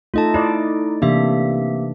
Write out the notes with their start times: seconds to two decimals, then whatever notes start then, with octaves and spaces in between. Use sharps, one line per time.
0.14 A3 D#4 F4 A4 D#5 A5
0.34 D#4 E4 D5 D#5
1.02 C3 E3 A#3 D4 G4 E5